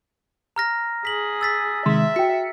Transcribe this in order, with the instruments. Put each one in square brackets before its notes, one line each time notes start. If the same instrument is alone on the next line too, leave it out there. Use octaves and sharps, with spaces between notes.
[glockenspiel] A#5 F6 A#6
[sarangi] G#4 [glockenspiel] B6 F#7
[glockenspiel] E6 A6 B6
[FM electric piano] C3 D#3 G#3 [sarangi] E5 [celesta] C6
[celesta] F#4 G5 [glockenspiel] B6 [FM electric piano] C#7